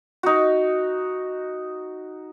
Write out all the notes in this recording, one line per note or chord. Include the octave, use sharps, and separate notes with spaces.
D#4 F#4